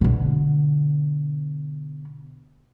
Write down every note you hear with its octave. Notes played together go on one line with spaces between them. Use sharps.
B2 D3